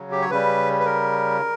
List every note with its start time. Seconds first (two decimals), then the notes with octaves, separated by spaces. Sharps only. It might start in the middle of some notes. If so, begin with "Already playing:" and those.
Already playing: C#3 F#3
0.12 G4
0.22 C#5
0.30 C#3 G3 B4
0.80 B4
0.86 A#4